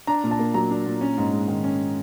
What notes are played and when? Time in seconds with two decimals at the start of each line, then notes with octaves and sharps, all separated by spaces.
0.07 D4 A#5
0.24 A#2
0.31 A5
0.39 A#3
0.54 F#3 A#5
0.71 D4
0.86 A#2
1.01 C#4
1.18 G#2
1.33 G#3
1.48 D#3
1.64 C#4